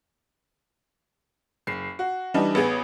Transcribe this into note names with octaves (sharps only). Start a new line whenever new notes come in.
F#1 C7
F#4
E3 G3 D4 D#4
A1 B3 G#4